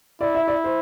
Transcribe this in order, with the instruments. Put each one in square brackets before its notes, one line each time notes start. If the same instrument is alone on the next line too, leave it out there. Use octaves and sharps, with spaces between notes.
[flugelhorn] E4 [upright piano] D5
[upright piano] E5
D5
C5